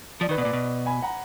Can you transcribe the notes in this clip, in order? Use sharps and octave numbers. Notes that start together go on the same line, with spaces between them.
F3 D5
D#3 B4
B2
A#2 D5
B2
G#5 B5
F#5 A#5